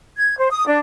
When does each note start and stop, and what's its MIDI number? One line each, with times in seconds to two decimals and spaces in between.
0.17 0.37 92
0.38 0.50 72
0.51 0.67 87
0.67 0.79 62